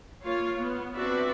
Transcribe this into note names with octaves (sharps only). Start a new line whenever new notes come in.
A#3 F4 C#5 F5
B3
C4 D4 F#4 B4 D5 E5